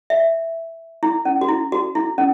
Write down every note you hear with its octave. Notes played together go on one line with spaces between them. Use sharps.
E5
E4
C#4
F#4
E4
F#4
E4
C#4